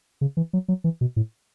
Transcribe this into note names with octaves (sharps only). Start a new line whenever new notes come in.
C#3
E3
F#3
F#3
E3
B2
A2